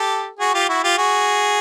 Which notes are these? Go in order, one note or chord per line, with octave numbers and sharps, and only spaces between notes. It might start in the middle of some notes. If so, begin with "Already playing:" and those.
Already playing: G4 A4
F#4 G#4
F4 G4
E4 F#4
F4 G4
F#4 G#4